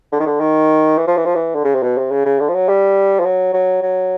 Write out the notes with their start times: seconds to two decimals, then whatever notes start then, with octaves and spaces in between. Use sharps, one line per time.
0.12 D3
0.20 D#3
0.26 D3
0.40 D#3
0.98 E3
1.07 F3
1.17 E3
1.25 F3
1.35 E3
1.55 D3
1.64 C#3
1.74 C3
1.82 B2
1.98 C3
2.11 C#3
2.26 C#3
2.39 D3
2.49 F3
2.54 F#3
2.68 G3
3.20 F3
3.25 F#3
3.53 F#3
3.82 F#3